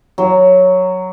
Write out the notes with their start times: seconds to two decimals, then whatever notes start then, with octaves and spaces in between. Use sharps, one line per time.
0.18 F#3